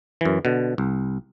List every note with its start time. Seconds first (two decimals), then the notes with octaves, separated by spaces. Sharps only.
0.21 F#2 E3
0.45 B2 D3
0.78 C2